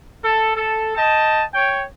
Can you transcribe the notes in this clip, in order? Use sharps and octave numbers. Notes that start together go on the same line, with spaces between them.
A4
A4
D#5 G5 A5
C#5 G5